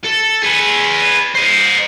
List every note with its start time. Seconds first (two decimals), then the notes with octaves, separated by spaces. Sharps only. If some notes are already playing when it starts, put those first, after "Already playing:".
0.04 A4
0.43 G#4 B4
1.34 C5 D#5